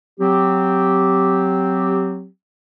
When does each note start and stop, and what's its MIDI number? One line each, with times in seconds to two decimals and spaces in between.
0.20 2.27 54
0.20 2.27 60
0.20 2.27 67